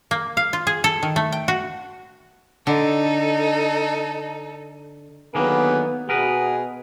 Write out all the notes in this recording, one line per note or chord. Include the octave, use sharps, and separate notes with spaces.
A#3
F5
F4
G#4
A4
D#3
A3
G5
F#4
D3 D#4 A4
D3 D#3 F#3 A#3 B3 G#4 B4
B2 B3 G#4 A#4 B4